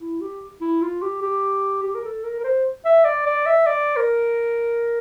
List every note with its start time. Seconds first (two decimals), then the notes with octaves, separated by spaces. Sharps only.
0.01 E4
0.21 G4
0.61 E4
0.82 F4
1.02 G4
1.22 G4
1.83 G4
1.95 A#4
2.04 A4
2.24 A#4
2.40 A#4
2.44 C5
2.85 E5
3.05 D5
3.26 D5
3.46 E5
3.66 D5
3.97 A#4